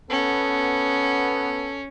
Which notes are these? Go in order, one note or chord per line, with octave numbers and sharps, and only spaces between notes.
B3 C#4 A4